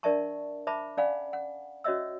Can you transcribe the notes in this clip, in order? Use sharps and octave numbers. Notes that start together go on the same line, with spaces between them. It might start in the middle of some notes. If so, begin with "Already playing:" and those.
D4 A#4 D5 E5 A5 C#6
C5 E5 A5 B5 D6
C#4 D5 F5 F#5 G#5 B5
F#5
C#4 F#4 C#5 D#5 E5 E6